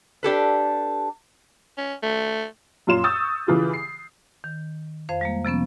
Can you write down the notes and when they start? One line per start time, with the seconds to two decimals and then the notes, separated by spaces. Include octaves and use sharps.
0.23 D4 G4 A4 B4
1.78 C#4
2.03 A3
2.87 F#2 A#2 F4 C#5 C6 E7
3.04 C#6 D#6 E6 G6 A6
3.47 C#3 E3 F4 G4
3.73 C7
4.44 D#3
5.09 F2 C5 F5
5.21 G3 G#3 A#3
5.45 C3 F3 B3 C#4